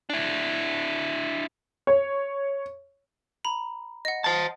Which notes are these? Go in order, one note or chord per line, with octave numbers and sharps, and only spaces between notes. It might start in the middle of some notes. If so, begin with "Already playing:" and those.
D4 E4
C#5
A#5 B5
D#5 F#5
C5 A5